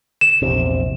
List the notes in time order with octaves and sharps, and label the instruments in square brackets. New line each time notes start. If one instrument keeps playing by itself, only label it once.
[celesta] E7
[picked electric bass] A#1 E2 C3